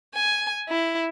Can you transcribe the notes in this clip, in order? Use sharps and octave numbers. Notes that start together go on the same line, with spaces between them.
G#5
E4